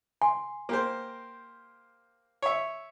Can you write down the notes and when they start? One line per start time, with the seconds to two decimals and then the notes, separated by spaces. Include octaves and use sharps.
0.22 G#5 C6
0.69 A#3 G4 C5
2.42 C#5 E5